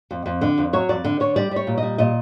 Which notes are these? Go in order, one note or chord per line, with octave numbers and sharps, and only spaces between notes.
F2
F2
D3
F2
F#3 C#5
F2 D5
D3
D3 C#5
G3 D5
G3 C#5
A#2
D#5
G3
A#2 D#5